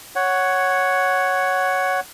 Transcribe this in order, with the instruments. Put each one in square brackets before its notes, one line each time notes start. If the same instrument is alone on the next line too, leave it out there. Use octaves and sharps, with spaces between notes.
[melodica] C#5 F#5